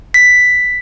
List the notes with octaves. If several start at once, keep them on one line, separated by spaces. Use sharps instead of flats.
B6